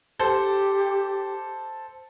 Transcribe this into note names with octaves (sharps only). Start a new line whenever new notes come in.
G4 A4 C5